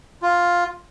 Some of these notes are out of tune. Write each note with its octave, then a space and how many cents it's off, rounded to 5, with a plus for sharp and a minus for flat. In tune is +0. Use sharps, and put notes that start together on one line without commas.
F4 +5